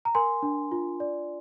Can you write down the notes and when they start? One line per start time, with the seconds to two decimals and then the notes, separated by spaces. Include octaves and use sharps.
0.05 A#5
0.15 A#4 G#5 C6
0.43 D4
0.72 F4
1.00 D5